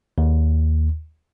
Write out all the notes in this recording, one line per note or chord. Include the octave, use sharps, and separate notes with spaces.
D#2